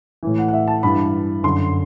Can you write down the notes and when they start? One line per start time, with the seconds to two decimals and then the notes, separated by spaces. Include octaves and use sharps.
0.23 A2 E3
0.38 F#5
0.48 F#5
0.53 E5
0.68 A5
0.83 G2 E3 B5
1.43 F#2 D3 C6